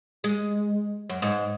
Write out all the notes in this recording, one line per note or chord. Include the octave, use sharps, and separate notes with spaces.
G#3
F#2
G#2